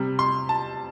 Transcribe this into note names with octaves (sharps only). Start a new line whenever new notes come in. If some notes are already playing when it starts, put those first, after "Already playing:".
Already playing: C3 G3
C6
A5